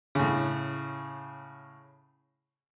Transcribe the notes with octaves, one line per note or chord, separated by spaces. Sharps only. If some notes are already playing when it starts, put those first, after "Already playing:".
A2 C#3